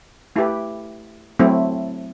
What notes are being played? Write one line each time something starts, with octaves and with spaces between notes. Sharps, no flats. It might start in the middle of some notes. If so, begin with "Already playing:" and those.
A3 E4 G4 B4
F#3 A3 C4 E4